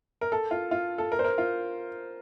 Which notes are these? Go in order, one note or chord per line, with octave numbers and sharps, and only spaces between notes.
A#4
A4
F4
F4
A4
A#4
C5
A#4
F4